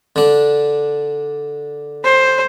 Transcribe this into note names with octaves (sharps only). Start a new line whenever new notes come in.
D3 D4
C5